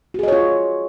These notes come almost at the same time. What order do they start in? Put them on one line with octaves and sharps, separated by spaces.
F#4 G#4 D#5 C#5 F4